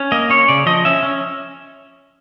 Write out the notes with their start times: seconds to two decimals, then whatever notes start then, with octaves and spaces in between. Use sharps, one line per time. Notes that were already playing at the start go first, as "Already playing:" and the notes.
Already playing: C#4
0.12 A#3 D#5
0.30 C#4 C#5
0.48 C#3 D5
0.66 F3 D#5
0.85 C#4 E5
1.03 C#4